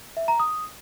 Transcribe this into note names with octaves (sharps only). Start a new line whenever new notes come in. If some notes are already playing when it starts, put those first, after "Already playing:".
E5
A#5
D#6